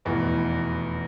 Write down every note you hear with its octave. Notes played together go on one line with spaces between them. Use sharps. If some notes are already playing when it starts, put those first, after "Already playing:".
F1 E2 B2